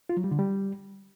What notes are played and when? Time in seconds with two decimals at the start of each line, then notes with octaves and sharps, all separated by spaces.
0.09 F4
0.17 F#3
0.24 G3
0.31 D3
0.39 G3